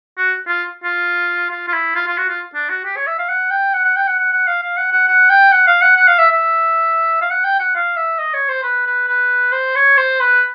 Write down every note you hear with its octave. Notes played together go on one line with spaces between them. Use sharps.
F#4
F4
F4
F4
F4
E4
F4
F4
F#4
F4
D4
F#4
G4
C#5
E5
F5
F#5
G5
F#5
F#5
G5
F#5
F#5
F#5
F5
F5
F#5
F#5
F#5
G5
F#5
F5
F#5
F#5
F5
E5
E5
F5
F#5
G5
F#5
F5
E5
D#5
C#5
C5
B4
B4
B4
C5
C#5
C5
B4